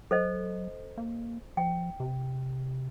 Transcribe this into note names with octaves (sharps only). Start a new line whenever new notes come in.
F#3 A4 C5 D#5
A#3
F3 G5
C3